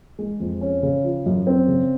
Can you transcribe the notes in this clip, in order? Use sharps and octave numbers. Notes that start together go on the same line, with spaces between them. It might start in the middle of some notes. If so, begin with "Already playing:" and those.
G#3
F2
C#4
C#3
F3
F#2
C4
C#3